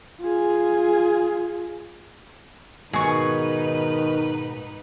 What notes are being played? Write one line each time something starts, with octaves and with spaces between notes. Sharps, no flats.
F4 G#4
G#2 B2 D#3 D#4 G#4 B4 C#6